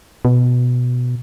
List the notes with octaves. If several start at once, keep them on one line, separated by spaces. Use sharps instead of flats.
B2